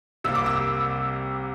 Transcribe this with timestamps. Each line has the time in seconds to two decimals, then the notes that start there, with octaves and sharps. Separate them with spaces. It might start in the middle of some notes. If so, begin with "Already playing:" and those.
0.24 C2 C3 G3 A#3 E6
0.35 D6
0.46 E6